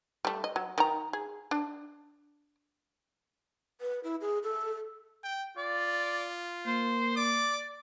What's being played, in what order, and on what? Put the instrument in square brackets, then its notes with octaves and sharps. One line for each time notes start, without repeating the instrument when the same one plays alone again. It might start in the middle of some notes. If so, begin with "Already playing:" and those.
[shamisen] G3 A3
D#5
F#3
D#3 A#5
G#4
D4
[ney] B4
E4
G#4
A4
[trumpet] G5
[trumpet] F4 [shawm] D5
[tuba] A#3 [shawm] C5
[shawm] D5 [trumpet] D6